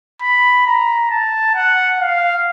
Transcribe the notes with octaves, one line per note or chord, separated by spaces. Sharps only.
B5
A#5
A5
F#5
F5